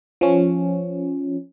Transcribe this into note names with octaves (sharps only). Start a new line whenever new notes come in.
F3 C#4